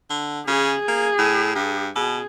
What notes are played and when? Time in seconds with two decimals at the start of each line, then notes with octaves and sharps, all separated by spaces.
0.10 D3
0.47 C#3 G#4
0.88 A#3
1.19 A2
1.55 G2
1.96 B2 G#4